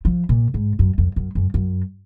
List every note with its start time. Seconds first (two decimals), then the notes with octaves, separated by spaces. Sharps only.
0.05 F3
0.29 A#2
0.54 G#2
0.79 F#2
0.98 F2
1.16 F#2
1.35 F#2
1.54 F#2